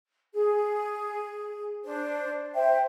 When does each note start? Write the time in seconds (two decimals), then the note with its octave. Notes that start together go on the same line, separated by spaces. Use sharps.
0.34 G#4
1.84 D4 C5
2.55 C5 E5 G5